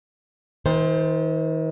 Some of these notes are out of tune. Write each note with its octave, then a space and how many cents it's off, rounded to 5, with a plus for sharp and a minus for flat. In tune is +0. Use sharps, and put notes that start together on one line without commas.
D#3 +45 C5 +0